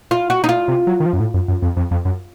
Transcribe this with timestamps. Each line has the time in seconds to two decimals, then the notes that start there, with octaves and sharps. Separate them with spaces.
0.11 F4
0.30 F#4
0.44 D#4
0.49 F4
0.68 C3
0.87 F#3
1.00 D#3
1.06 F3
1.13 F#2
1.20 A2
1.34 F#2
1.48 F#2
1.62 F2
1.77 F2
1.91 F2
2.05 F#2